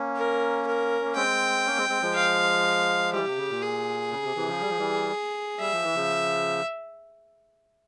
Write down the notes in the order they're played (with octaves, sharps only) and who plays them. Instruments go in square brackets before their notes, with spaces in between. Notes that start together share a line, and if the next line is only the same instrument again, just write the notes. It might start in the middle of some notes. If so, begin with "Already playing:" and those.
Already playing: [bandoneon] A#3 C#4
[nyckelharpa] A#4
A#4
[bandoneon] A#3
[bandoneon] G#3 C4 [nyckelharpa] G5
[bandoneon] A#3 C#4
G#3 C4
G#3 C4
F3 G#3
[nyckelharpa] F5
[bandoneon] E3 G3 [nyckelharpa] G4
[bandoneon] C3
C#3
A#2
[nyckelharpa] G#4
[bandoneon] C#3
C3
C3 E3
C#3 F3
G3
F3
E3 G3
[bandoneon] G3 [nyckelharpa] E5
[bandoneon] F3
E3
C#3 F3